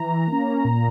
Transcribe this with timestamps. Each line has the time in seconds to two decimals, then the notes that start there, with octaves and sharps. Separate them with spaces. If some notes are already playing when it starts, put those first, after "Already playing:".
Already playing: E3 A#5
0.27 A#3 C#4
0.65 A#2